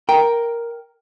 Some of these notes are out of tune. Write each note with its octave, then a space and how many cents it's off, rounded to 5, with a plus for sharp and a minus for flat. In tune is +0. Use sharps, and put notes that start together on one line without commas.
A#4 +5 G5 +0